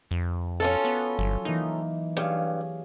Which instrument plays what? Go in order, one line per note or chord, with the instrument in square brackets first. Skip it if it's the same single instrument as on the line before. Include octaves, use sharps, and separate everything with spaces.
[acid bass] F2
[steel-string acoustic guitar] C#4 F4 A4 [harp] F#4
[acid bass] B3
[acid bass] G1 [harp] F#3
[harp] E3 A#3 [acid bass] D#4
[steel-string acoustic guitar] G2 [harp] G#4 C#5 F5